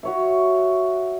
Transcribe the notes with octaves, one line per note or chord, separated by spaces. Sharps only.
F#4 C#5 E5